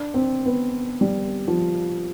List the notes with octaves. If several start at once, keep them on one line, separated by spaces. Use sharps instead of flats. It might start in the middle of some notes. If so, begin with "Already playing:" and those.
Already playing: D4
C4
B3
G3
F3